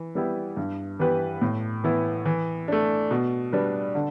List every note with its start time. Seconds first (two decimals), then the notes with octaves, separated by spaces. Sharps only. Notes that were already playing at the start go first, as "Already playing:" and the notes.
Already playing: E3
0.15 G3 B3 E4 G4
0.57 G2
0.99 E3 B3 G4 B4
1.41 A2
1.84 E3 B3 E4
2.25 E3
2.68 A3 D4
3.11 B2
3.52 G3 D4 B4
3.95 D3